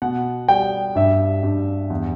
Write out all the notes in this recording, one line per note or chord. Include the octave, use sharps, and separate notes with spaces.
B2 F#5
G3 G5
G2 E5
G2
E2